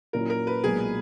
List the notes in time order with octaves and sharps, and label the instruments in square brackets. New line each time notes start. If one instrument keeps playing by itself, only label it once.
[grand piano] A#2 F#3 C#4 E4 [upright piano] A#4
[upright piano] A#4
B4
[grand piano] B1 A#2 G#3 [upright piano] G#4